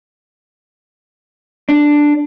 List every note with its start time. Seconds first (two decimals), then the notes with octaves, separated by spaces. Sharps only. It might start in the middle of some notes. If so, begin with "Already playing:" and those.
1.69 D4